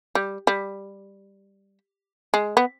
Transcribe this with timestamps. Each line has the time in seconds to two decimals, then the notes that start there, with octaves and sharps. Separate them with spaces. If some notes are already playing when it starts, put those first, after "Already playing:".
0.15 G3
0.47 G3
2.34 G#3
2.57 B3